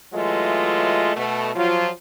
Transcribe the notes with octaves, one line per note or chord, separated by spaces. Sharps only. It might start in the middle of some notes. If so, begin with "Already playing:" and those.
E3 F#3 G#3 A3 F4 D#5
B2 A3
F3 F#3 F4